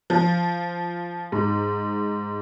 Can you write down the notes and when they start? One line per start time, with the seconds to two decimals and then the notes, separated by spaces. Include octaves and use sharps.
0.10 F3
1.32 G#2